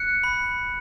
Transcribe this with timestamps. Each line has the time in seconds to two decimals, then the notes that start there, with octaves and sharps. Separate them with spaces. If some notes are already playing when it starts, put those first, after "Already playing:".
Already playing: F#6 C#7
0.24 B5